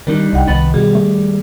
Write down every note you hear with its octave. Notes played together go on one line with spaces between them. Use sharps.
D#3 G3 D4 D#4
C2 D#5 F#5 G5
C2 D#3 B3 B5 A6
B2 G3 G#4
A3